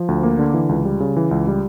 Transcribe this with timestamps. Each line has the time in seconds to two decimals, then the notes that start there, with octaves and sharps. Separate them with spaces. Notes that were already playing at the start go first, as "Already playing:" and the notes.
Already playing: F3
0.08 D2
0.23 A#3
0.39 D3
0.54 E3
0.69 C#2
0.85 G3
1.00 C#3
1.16 E3
1.31 C#2
1.47 G3